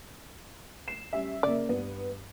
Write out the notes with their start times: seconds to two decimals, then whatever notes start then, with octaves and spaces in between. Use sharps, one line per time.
0.88 C7 E7
1.13 G3 C#4 E5
1.43 C#3 A#3 D5
1.69 G2 B3